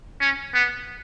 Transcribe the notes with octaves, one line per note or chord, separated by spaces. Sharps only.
C#4
B3